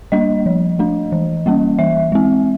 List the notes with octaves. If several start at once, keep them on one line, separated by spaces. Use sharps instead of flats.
G3 A#3 D4 D#5
F3
A3 D4
E3
G3 A#3 C#4
E3 E5
G#3 C4